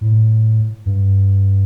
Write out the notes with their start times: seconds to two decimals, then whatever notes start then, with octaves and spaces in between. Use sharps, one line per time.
0.01 A2
0.86 G2